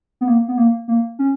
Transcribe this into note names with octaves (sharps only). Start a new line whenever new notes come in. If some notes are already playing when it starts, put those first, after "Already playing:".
B3
A#3
B3
A#3
A#3
C#4